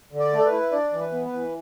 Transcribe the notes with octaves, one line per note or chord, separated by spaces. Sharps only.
D3
D5
A3
A4
B4
E4
D4 D5
E3
B4
B3
B4
E3